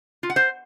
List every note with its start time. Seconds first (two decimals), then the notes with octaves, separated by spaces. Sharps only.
0.23 F4
0.30 F#5
0.36 C5